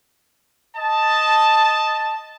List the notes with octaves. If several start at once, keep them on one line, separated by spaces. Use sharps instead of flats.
D#5 A5